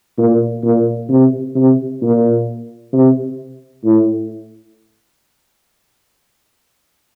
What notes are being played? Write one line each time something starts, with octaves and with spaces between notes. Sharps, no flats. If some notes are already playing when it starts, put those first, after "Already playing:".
A#2
A#2
C3
C3
A#2
C3
A2